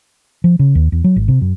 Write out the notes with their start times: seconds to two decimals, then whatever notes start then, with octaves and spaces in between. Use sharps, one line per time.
0.44 F3
0.59 C#3
0.75 D#2
0.92 E2
1.04 F#3
1.16 G#1
1.28 C3
1.41 F#2